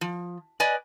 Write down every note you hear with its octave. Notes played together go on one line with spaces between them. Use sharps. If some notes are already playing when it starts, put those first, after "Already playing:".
F3
B4 D5 D#5 G#5